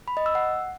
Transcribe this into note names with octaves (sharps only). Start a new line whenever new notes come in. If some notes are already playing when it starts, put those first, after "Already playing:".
B5
D#5
E6
F#5